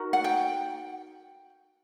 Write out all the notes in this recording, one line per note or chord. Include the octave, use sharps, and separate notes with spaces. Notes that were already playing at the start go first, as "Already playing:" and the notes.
Already playing: D#4 F#4 A#4
F#5
G5